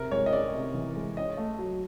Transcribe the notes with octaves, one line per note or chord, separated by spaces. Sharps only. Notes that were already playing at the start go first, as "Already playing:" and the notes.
Already playing: C3 A#4
G#3 C#5
D#5
C#4 D5
C3
E3
G#3
C#4 D#5
A3
F#3